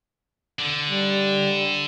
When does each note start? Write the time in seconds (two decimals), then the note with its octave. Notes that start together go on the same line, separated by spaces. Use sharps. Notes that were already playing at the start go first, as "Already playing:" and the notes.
0.59 D3
0.90 G3